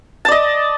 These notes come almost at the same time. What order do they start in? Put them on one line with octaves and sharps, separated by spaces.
A5 D5 D#5